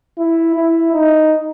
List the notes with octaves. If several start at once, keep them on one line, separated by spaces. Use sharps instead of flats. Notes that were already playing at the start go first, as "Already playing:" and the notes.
E4
E4
D#4